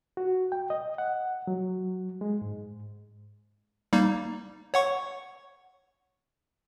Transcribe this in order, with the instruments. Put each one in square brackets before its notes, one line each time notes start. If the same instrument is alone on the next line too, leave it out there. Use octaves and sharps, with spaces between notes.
[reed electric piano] F#4
G5
D#5
F#5
F#3
G#3
G#2
[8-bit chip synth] G3 A#3 D#4
C#5 F#5 C#6